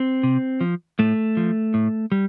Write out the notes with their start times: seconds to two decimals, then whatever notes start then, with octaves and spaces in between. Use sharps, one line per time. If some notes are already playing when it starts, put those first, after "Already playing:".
Already playing: C4
0.23 C3
0.61 F3
0.99 A2 A3
1.37 F3
1.74 A2
2.12 G3